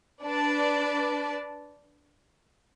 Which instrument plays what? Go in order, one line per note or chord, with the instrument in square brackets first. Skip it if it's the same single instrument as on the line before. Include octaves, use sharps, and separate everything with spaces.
[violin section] D4 B4 D5 A5